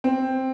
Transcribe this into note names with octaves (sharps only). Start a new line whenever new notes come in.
C4